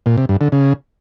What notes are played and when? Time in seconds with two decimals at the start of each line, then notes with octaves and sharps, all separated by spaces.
0.06 A#2
0.18 C3
0.29 G2
0.41 D3
0.52 C#3